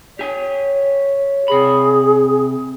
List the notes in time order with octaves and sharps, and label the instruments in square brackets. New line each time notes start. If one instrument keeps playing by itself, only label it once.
[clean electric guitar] G4 G#5 [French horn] C#5
[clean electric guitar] C3 B5 [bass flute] G#4